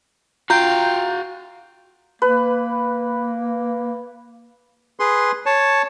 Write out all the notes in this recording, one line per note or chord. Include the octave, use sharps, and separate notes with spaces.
F4 F#4 F5 G5 A#5 G6
A#3 B4
G#4 B4 C6
C#5 A5